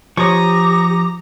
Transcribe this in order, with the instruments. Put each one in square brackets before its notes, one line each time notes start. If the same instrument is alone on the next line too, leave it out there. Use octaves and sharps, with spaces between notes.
[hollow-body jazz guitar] F3 C#5 [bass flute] G4 [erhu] A#5 [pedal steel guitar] C#6 D#6